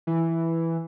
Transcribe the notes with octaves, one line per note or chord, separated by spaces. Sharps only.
E3